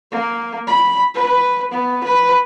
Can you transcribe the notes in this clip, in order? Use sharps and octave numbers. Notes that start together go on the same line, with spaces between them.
A#3
B5
B4
B3
B4